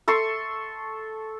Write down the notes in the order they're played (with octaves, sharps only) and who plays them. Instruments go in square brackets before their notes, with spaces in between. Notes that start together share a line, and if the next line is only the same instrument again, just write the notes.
[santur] A4 C6 C#6